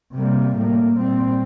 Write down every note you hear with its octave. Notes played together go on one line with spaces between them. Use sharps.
C3 G3 A#3
A2 G3 A#3
A#2 G3 C4